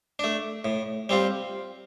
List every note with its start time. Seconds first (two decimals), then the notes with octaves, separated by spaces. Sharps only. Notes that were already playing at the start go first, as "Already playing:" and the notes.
0.19 A3 D4
0.65 A2
1.09 G3 C4 F4